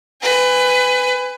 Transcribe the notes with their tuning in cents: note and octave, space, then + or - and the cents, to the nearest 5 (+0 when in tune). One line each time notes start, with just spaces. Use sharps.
B4 +25 G#5 -20